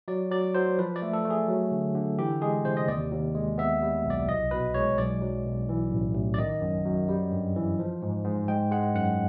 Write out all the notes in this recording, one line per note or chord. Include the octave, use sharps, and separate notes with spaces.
F#3 D5
F#3 D5
F#3 C5
F3 B4
D5
A3
A4
A3
G#4
F#3
D3
D3
E3 G4
G#3 G#4
C3 C5
D#5
D#2 D5
D#2
G#3
B3 E5
G3
B1
D5
C2 D#5
B2 B4
G#3 C#5
B1 D5
F#3
B1
E3
A1
A1
D5
D#3 D#5
F#2
F#2
G3
G2
E3
F3
G#2
G#2
G#3 G5
G#3 F#5
F#2 F#5